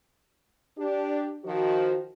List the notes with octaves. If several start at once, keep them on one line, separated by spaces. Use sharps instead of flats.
D4 G4
D#3 F3 F#4